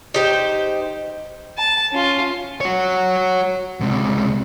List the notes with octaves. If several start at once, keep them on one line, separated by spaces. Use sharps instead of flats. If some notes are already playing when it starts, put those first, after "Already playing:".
D#4 G4 C5
A5
C#4 F4
F#4 C#5
C#2 C3